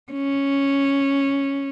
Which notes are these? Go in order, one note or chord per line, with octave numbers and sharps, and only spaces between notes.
C#4